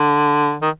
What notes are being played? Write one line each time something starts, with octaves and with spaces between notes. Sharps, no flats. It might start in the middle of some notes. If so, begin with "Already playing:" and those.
Already playing: D3
D#3